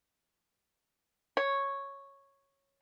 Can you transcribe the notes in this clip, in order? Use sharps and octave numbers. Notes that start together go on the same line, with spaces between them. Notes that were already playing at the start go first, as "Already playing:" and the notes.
C#5